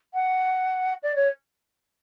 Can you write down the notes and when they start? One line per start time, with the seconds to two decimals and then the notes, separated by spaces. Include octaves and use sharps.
0.13 F#5
1.02 D5
1.15 C#5